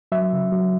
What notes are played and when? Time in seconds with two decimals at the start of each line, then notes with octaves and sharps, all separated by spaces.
0.12 F#3 E5
0.33 C#3
0.52 F#3